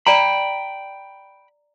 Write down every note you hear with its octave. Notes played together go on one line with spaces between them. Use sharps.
D5 G5 A#5 B5